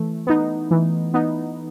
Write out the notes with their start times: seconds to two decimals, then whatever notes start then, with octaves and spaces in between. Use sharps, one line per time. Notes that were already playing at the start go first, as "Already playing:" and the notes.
Already playing: E3 A3
0.27 B3 D#4
0.71 E3
1.14 B3 D#4